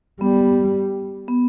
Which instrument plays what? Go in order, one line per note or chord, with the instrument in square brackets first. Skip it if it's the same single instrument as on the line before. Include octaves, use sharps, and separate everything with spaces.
[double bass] G3 [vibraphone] B3
[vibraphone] B3